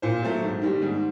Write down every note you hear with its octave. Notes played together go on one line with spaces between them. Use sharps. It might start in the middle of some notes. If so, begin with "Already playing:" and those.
A#2 C5
F#3 A3
G#2
D#3 G3
G#2